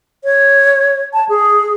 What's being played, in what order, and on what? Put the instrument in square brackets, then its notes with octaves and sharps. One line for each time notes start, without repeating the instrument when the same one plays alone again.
[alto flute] C#5
A5
G#4